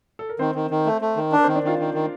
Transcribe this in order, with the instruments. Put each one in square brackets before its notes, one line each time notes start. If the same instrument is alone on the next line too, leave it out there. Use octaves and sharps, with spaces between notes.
[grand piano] A4
A#4
[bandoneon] D#3 [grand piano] C4 C5
[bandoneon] D#3
D#3
A3
A3
D#3
D4
[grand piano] A#4
C4 C5
[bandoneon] D#3
[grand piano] D4 D5
[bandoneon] D#3 [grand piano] F4 F5
[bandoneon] D#3
D#3